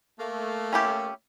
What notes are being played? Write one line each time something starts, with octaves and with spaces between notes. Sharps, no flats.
A3 A#3
C#4 E4 G4